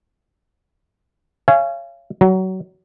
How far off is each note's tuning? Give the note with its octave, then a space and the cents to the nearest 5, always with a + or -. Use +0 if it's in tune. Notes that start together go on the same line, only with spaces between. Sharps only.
C#5 +0 F5 -35 G#5 +0
F#3 +25 A#5 +0